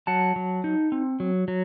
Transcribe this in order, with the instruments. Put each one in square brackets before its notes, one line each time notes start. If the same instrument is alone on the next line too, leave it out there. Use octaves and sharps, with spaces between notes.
[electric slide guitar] F#3 F#5 A5
F#3
D#4
C4
F#3
F#3